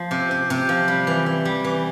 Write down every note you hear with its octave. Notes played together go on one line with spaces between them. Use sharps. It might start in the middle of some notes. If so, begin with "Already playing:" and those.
Already playing: F3
C3
C3
C3
F3
G3
E3
E3
G3
E3